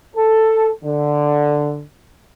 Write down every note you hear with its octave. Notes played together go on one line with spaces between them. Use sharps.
A4
D3